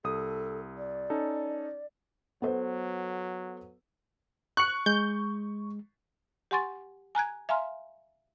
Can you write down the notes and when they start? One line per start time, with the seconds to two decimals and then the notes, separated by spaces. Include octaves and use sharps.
0.04 C2 A4 D#6
0.77 D5
1.10 C#4 D#4 A4
2.42 F#3 B3 A4 C5
4.57 C#6 F#6 C#7
4.86 G#3 G6
6.51 G4 F#5 G#5 C6 C#6 A6
7.15 G#5 A#5 F#6 G#6
7.49 E5 F5 G#5 A#5 C6 F6